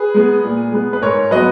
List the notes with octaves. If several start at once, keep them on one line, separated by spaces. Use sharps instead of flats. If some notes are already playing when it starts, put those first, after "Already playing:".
Already playing: G#4 B4
G#3 B3
A#2
G#3 B3
B4
G#2 A#4 C#5
F#3 B3 B4 D#5